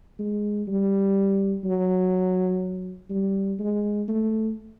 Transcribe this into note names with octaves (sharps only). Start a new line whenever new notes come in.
G#3
G3
F#3
G3
G#3
A3